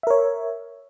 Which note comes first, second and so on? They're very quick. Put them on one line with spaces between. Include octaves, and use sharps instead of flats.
E5 A#4 C#5